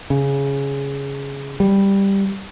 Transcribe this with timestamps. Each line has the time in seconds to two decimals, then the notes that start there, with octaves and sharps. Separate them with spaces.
0.10 C#3
1.60 G3